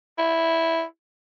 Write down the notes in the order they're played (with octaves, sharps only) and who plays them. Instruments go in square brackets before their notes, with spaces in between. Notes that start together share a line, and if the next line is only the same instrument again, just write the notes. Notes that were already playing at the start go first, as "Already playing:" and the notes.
[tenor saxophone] E4